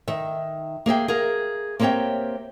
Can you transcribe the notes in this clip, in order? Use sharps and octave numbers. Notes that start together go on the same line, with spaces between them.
D#3 E5
A#3 G#4 E5 G5
G#4 A#4 F5
A#3 C4 G4 C#5 E5 G5